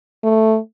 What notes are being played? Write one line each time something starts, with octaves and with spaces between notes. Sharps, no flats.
A3